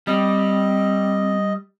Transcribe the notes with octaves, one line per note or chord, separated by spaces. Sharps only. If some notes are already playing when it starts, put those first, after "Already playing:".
G3 C4 D#5